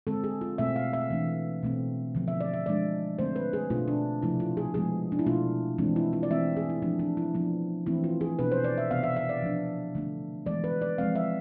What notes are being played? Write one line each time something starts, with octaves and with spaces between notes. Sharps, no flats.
D3 G#3 C4 A4
G#4
F4
B2 A3 C4 E5
F5
E5
E3 A3 D4
B2 A3 C4
D3 F3 B3
E5
D5
E5
D3 F3 G#3 D4 D5
D3 A3 C4 C5
B4
G#4
B2 A3 D4 F4
D4
C3 F3 A3 E4
F4
G#4
F3 G#3 B3 G#4
D4
E4
B2 A3 D4 F4
E3 G#3 C4 D4
E4
F4
D5
E3 A3 C4 E5
G#4
E4
F3 A3 D4
D4
E4
F3 B3 D4
E3 A3 C4 E4
F4
G#4
B2 B3 D4 B4
C5
D5
E5
C3 E3 B3 F5
E5
E5
D5
F3 B3 D4
D3 A3 D4
E3 G#3 B3 D5
B4
D5
F3 G#3 C4 F5
E5